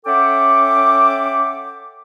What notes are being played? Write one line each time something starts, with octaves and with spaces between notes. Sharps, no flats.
C#4 A4 E5 F#5 G5 D6